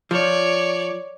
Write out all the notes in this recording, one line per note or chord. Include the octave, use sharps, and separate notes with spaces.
F3 C#5 D5